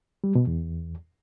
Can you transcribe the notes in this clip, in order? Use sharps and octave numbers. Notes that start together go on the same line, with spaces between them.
G3
B2
E2